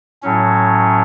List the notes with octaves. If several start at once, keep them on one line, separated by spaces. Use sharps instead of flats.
A2 F#3 C#4